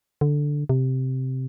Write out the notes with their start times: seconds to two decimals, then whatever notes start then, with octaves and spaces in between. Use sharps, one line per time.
0.21 D3
0.69 C3